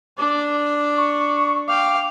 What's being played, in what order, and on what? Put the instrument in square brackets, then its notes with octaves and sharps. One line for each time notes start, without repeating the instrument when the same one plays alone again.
[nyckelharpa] D4 D5
[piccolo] C#6
[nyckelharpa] F5 G5 [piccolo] D6